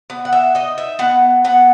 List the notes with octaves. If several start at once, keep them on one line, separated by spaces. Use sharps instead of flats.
B3
F#5
E5
D#4 D#5
E5
B3 F#5
B3 F#5